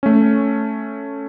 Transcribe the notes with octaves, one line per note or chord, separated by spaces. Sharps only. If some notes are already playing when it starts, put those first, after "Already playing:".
A3 C#4